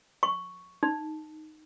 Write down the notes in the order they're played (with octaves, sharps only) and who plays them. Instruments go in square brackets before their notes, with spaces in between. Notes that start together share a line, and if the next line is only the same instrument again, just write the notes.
[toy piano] C#6
D#4